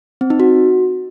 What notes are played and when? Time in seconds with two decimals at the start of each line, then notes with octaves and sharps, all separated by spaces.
0.21 C4
0.30 D#4
0.40 F#4